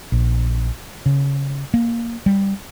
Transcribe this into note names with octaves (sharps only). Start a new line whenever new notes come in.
A#1
C#3
A#3
G3